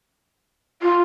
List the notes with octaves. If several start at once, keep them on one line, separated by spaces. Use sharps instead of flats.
F4